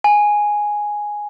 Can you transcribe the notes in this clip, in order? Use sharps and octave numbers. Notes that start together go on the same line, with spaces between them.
G#5